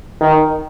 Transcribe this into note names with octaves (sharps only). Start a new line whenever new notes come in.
D#3